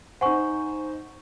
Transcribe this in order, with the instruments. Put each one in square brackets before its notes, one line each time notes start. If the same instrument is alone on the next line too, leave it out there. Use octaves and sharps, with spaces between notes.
[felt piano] D#4 C5 [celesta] F#5 G#5 C#6